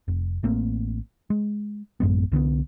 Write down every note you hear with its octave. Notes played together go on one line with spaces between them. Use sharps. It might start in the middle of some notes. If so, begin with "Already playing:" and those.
F1
A1 A3 A#3 C4
G#3
A1 F#2 G#3 B3
C2 D3 E3 B3